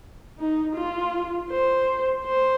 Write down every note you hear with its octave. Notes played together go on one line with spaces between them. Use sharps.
D#4
F4
C5
C5